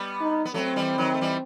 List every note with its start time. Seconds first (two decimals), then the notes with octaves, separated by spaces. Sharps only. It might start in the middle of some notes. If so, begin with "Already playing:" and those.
Already playing: G3 B3
0.21 D#4
0.45 B3
0.54 F#3 A3 C4
0.76 E3 G3
0.98 D#3 F#3
1.14 A3
1.21 E3 G3